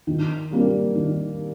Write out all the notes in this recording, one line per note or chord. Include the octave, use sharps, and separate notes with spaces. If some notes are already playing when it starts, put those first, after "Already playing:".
D#3
G3 A#3 D4
D#3